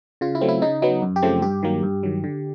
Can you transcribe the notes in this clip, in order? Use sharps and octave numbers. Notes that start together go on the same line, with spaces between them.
C#3 F4
E4
F#3 A3 C4
E4
C#3 D#4
F#3 B3 D#4
F#2
G4
C#3 F3 A3 C4
G2 G4
D#3 F#3 A#3
G2
D#3 F#3
D3